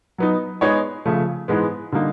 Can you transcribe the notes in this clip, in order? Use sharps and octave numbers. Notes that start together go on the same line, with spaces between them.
F#3 B3 D#4
G#3 B3 D#4 G#4 C#5
C#3 F3 A3
G#2 E3 G#3 B3
D3 G3 A#3 D#4